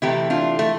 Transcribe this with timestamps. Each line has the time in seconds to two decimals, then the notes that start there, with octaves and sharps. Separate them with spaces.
0.02 C3 E3 A3 E4 G4
0.30 D4 F4
0.59 A3